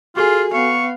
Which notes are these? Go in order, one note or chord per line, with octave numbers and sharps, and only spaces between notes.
F4 F#4 G#4 A4 G#5
B3 F5 C#6